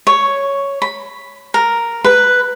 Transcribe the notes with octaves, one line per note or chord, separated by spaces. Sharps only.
C#5
B5
A#4
B4